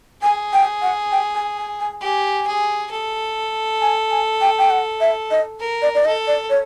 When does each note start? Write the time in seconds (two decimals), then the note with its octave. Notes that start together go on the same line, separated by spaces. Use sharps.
0.23 G#4 G#5
0.53 G5
0.82 F#5
1.12 G5
1.35 G#5
1.57 G#5
1.80 G#5
2.01 G4 G#5
2.47 G#4
2.91 A4
3.82 G#5
4.11 G#5
4.41 G5
4.58 G5
4.70 F#5
5.01 E5
5.31 D#5
5.60 A#4
5.82 D5
5.95 D5
6.05 A4 D#5
6.27 D5
6.50 C#5